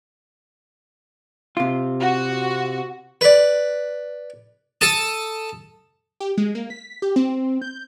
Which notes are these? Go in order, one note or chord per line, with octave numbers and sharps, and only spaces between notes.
C3 F4
F#4
B4 D5
A4 A5 D#6
G4
G#3
A#3
B6
G4
C4
G6